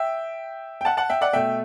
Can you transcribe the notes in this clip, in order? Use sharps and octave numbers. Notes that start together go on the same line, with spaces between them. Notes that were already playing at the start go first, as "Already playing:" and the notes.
Already playing: E5 G5
G5
F#5 A5
F#5 A5
E5 G5
D5 F#5
B2 A3 E5 G5